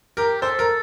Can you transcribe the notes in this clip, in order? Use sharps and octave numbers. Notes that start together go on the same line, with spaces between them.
G4 A#4
A4 C5
A#4